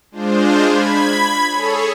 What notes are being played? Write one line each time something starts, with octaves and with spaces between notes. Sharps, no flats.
G#3 D4 F4 C5
B5 G#6
G#4 A4 C#5